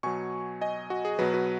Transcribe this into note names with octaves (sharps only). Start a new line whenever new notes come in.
B2 F#3 G#5 C#6
D#5 G#5
F#4
G#4
B2 F#3 F#4 B4
F#4 B4